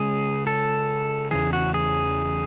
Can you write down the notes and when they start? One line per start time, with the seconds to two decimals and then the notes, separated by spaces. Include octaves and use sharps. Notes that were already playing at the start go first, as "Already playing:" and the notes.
Already playing: C#3 G#3 C#4 G#4
0.47 A4
1.31 E2 C#3 E3 G#4
1.53 F#4
1.74 G#4